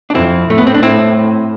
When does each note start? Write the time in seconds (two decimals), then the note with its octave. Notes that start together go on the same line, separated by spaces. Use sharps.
0.10 D4
0.15 F2 C4 E4
0.49 A2 A3
0.58 B3
0.67 C4
0.74 D4
0.83 A2 C4 E4